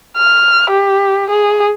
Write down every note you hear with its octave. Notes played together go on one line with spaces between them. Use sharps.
F6
G4
G#4